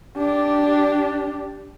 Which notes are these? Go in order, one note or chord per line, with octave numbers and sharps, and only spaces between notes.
D4 G4